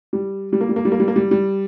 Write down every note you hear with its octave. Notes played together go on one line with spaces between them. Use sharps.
G3
G3
A#3
G3
A#3
G3
A#3
G3
A#3
G3
G3